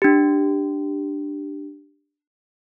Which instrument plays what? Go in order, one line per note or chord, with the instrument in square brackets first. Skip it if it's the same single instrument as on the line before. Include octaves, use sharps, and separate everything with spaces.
[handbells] D4 G4